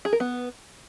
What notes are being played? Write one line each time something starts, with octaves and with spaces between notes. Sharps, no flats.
G#4
A#4
B3